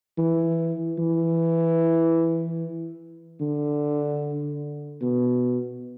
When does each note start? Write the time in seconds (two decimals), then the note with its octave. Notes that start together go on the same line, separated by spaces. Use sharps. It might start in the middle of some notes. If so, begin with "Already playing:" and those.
0.18 E3
0.99 E3
3.41 D3
5.02 B2